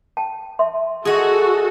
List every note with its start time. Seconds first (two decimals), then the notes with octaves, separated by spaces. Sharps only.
0.17 G5 A5
0.59 E5 C6
1.05 F#4 G#4 A4 D#5